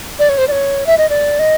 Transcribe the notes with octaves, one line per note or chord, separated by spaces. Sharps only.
D5
C#5
C5
D5
C#5
E5
D#5
D5
D#5